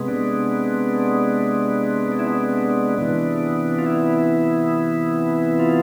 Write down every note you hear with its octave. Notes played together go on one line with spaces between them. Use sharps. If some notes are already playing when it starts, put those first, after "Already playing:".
Already playing: C3 G#3 B3
D4
D4
E4
D4
C3 E3 B3
F4
E4
F4